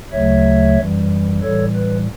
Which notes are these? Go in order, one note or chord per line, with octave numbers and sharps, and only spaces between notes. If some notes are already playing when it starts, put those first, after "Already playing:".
D2 C#3 F#3 A3 C#5 E5
F#2 E3 G3
A2 E3 G3 A4 C#5
B4